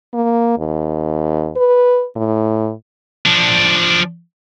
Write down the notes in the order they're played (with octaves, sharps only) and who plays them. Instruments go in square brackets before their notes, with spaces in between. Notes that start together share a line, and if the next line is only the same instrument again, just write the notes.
[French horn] A#3
D#2
B4
A2
[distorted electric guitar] F3 D4